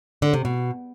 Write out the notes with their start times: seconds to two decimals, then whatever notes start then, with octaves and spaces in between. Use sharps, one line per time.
0.22 D3
0.33 C3
0.45 B2